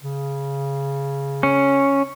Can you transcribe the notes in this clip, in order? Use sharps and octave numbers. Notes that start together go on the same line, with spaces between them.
C#3
C#4